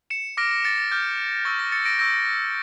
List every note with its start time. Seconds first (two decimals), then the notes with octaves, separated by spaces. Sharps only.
0.10 C#7 E7
0.37 D6 F6 A#6 D7
0.51 A#6
0.64 A6 C#7
0.78 A6
0.91 D6 F6 G6
1.45 C#6 E6 G6 A6
1.59 A#6
1.72 A6 C#7
1.85 A#6 D7
1.99 C#6 E6 G6 A#6 D7